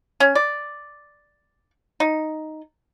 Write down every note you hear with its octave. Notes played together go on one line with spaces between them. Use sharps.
C#4
D5
D#4